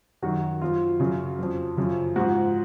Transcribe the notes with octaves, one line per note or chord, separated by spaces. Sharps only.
F#2 D#3 F#3 F#4
F#2 F3 F4
F#2 C#3 F#3
F2 F3
F#2 C#3 F3
G#2 F3 F#4